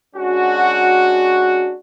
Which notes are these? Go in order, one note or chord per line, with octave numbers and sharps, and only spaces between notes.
G#3 C#4 D4 F#4